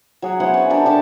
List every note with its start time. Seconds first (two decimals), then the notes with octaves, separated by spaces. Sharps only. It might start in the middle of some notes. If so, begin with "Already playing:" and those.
0.22 F#3 G#4 F#5
0.40 B3 E4 C5 F#5
0.54 C#4
0.70 D4 G4 A#4
0.85 D4 G4 A4 A5